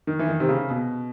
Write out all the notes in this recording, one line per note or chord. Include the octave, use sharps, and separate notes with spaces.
D#3
E3
D#3
C3
C#3
B2